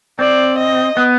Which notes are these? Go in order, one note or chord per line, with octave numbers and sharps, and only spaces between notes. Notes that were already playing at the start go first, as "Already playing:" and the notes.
C4 D5
D#5
B3